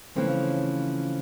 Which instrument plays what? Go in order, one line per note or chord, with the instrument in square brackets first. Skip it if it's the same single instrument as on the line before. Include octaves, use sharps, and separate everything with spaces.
[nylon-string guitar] C#3 E3 F3 A3 C4 C#4